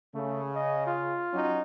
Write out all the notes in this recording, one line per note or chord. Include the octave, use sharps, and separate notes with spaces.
C#3 A3
D#5
F4
F#3 C#4 D#4